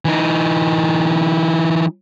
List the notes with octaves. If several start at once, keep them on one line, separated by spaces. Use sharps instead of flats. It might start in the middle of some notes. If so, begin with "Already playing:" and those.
E3 D#4